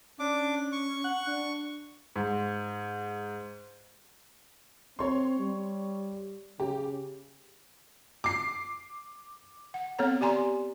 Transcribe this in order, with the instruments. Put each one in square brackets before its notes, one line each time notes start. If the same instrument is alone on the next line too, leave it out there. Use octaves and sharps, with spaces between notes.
[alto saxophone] C#4 [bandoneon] D4 D6
[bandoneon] C#6
[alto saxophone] F#5
D4
[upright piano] G#2
[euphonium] C4 [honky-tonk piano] C#5 C6
[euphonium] G3
[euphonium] C#3 [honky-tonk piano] G4
[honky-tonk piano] D6 C7
[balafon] F#5
B3 C4 A4 C#5 A#5
G4 D5 G#5 A#5 C6